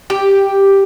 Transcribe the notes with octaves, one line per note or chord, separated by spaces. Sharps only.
G4